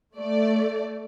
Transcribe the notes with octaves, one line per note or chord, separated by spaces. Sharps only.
A3 D5